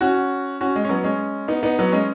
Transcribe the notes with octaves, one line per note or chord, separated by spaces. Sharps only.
C#4 F#4
C#4 F#4
G#3
C#4
F#3 B3
G#3 C#4
B3 D#4
B3 D#4
F#3 B3
G#3 C#4